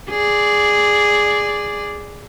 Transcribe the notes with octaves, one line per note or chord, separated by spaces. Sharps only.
G#4 D5